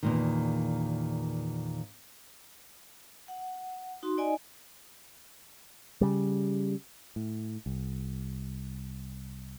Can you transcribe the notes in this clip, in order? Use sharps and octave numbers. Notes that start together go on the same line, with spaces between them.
E2 A#2 D#3
F#5
D#4 F#4 C6
D#4 D5 D#5 G#5
C#3 G3
A2
C2